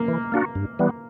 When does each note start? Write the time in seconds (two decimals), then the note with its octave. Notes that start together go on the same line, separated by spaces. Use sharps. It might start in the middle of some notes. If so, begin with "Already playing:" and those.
Already playing: A#3
0.08 E3
0.32 A#3 D4 F#4
0.55 G2
0.79 E3 G3 B3